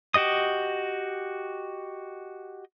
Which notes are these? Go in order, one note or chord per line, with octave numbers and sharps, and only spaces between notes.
F#4 G4 D#5 D#6